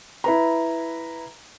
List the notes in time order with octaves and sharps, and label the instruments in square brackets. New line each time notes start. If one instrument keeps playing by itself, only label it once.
[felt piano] E4 B4 A#5